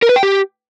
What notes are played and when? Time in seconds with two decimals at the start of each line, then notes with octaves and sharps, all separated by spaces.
0.02 A#4
0.09 B4
0.16 G5
0.23 G4